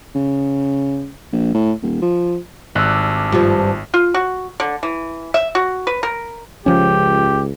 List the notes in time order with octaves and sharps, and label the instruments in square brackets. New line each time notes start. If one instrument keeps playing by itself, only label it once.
[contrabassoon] C#3
A#1
A2
D#1
F3
[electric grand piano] G#1 F#6 [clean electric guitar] G3 D4 A4
[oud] G2 F3 [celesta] F4 G4
[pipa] F4
F#4
D3
E3
E5
F#4
B4
A#4
[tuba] C#2 [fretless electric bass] F3 C#4 [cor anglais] G4